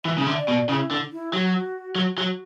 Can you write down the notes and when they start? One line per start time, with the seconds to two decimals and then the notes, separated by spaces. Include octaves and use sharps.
0.05 E3 E5
0.18 C#3
0.26 D3
0.37 D5
0.48 B2
0.69 C#3 E4
0.91 D3
1.12 E4
1.33 F#3 F#4
1.96 F#3 F#4
2.18 F#3